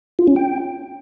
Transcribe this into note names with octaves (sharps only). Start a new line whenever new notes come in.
F4
C#4
G5